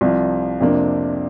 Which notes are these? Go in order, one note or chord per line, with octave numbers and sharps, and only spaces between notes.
C2 C3 F3
F2 C3 A#3 D4